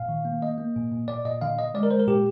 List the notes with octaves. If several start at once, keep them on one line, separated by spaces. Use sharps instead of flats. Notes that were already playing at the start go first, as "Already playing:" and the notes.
Already playing: A#2 F5
D#3
A#3
A#3 D#5
A#3
A#2
A#2
A#2 D5
A#2 D#5
D3 F5
D3 D#5
G#3 D5
A#4
G#3 C5
A#4
A#2 G4